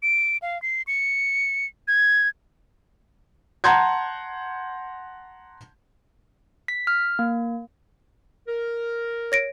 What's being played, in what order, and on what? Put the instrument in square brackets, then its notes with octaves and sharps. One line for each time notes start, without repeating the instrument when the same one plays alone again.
[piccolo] D7
F5
C7
C#7
G#6
[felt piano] F#5 A5 A#5 C6 G6 G#6
[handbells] B6
F6
A#3
[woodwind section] A#4
[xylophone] C#5 A#6 D7